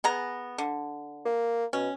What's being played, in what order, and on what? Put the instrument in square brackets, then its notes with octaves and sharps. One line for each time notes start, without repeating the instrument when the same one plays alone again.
[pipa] B3 G#4 A#5
D3
[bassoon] A#3
[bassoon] B2 [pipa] C#4